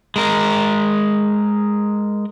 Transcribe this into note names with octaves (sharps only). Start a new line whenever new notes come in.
G#3 A#4